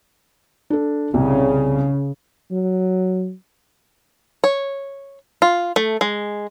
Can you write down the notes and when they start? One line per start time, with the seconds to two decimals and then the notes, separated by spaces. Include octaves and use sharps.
0.70 D4 A4
1.14 C2 C#3
2.51 F#3
4.44 C#5
5.42 F4
5.76 A3
6.01 G#3